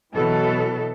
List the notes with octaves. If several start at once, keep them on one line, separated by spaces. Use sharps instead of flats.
B2 E3 F#3 A4